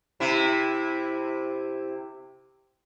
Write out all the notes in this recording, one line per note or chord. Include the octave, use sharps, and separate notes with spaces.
C3 E4